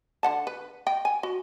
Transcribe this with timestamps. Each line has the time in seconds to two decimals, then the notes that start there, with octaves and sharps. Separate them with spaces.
0.23 D3 F#5 A5
0.47 B4
0.87 D#5 G5
1.05 G#5
1.23 F#4